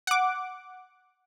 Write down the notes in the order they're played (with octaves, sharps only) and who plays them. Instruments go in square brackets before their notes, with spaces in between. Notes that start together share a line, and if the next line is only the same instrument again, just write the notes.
[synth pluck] F#5 D6